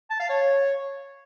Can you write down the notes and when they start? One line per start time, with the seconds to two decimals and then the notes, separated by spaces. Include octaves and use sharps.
0.10 A5
0.20 F5
0.29 C#5